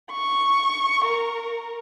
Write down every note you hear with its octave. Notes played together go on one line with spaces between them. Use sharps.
C#6
A#4